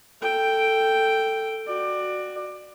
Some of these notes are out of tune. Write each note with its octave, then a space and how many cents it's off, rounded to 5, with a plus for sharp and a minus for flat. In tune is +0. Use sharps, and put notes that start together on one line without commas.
A4 +10 G5 +0
F#4 +0 D5 +20